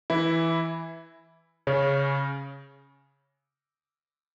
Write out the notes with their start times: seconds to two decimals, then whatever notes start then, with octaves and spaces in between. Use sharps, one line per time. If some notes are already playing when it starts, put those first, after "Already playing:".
0.10 E3 E4
1.67 C#3 C#4